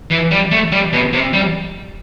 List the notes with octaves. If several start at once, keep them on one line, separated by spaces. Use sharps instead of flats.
E3
G3
A3
G3
B2
C3
G3